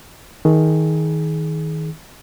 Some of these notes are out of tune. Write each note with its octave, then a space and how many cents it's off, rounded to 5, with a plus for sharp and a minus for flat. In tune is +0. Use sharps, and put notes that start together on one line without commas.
D#3 +25 G#4 +20